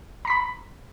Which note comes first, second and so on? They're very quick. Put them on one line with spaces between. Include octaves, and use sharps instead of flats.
A#5 B6 B5